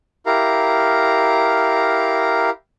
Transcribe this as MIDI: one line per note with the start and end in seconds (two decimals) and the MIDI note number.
0.26 2.50 64
0.26 2.50 67
0.26 2.50 70
0.26 2.50 77
0.26 2.50 82